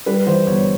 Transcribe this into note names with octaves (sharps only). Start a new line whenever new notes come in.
G3 B4
E3 C5
G1 C#5